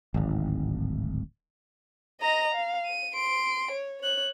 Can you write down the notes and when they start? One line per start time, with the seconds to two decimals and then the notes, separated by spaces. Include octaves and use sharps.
0.14 D1 G#1
2.20 D#5 A#5
2.55 F5
2.86 D#7
3.15 C6 D7
3.71 C#5
4.02 C#5 F#6